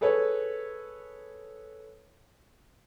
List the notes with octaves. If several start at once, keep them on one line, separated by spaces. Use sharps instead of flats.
G#4 A4 B4 C#5